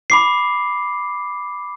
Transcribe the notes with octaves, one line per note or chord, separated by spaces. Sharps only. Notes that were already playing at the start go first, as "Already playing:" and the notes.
B5 D6 C7